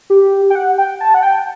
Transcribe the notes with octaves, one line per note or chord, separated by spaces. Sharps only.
G4
G5
F#5
G5
A5
F#5
G5